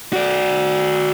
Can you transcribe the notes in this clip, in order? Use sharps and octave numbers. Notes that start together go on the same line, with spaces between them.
F#4 D5